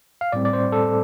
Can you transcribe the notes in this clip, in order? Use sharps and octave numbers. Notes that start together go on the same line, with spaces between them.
F5
A2 G3 C4 D5
D5
C5
A4